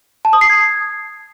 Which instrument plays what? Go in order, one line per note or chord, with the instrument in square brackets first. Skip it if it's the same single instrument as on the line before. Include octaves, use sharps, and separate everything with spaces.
[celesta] A5
D#6
C7
G#6